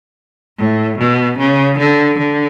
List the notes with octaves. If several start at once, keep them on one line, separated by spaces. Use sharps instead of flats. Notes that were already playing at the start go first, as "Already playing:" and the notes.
A2
B2
C#3
D3
D3